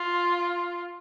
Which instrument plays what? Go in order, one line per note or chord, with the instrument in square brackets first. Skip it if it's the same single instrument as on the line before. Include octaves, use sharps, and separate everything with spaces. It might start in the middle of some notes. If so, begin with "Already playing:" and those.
Already playing: [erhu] F4